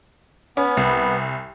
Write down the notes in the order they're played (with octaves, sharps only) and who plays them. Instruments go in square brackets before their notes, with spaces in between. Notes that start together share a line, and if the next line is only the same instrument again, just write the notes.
[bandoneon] B3 [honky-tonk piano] C#4
[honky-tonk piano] C2